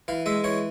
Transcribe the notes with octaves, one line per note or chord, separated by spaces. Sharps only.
E3 F5
G#3 E5
E3 C#5